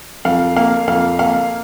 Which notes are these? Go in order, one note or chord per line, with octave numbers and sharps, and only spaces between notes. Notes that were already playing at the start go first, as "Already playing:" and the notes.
F2 F5
A#3 F5
F2 F5
A#3 F5